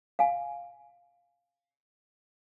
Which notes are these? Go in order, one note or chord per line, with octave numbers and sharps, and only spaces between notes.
F5 G#5